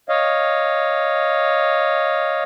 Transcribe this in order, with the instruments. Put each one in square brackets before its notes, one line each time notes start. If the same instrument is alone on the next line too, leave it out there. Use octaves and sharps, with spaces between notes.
[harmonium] C#5 D#5 F5